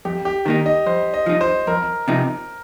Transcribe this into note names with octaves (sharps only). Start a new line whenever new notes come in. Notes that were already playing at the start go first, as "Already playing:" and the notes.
F2 G4
G4
D#3 A#3 D#4 G4
D#5
F2 C5
D#5
F3 D#4
C5
F2 A#4
C3 F3 D#4